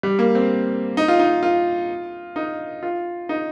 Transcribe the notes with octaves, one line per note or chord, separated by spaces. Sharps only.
G3
A#3
C4
D#4
F4
D#4
F4
D#4
F4
D#4